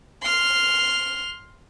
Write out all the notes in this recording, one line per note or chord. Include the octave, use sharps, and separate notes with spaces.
C6 F6